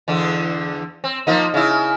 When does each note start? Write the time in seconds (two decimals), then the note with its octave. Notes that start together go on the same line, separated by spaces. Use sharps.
0.08 E2 D3 D4
1.04 C4
1.27 F3 A#3 D#4
1.54 C#3 E4